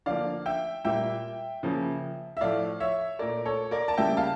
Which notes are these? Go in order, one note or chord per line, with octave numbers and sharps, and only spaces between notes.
D3 F3 A#3 D5 F5
E5 G5
A#2 G3 A#3 E5 G5
C#3 F3 A#3
E5
A2 F3 A3 D5 F5
C#5 E5
A#2 A3 A#4 D5
A4 C#5
A#4 D5
A5
C#3 G3 A#3 E5 G5
F5 A5